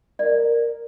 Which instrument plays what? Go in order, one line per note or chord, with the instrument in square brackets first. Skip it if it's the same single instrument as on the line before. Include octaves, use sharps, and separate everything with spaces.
[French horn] A#4 [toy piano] D5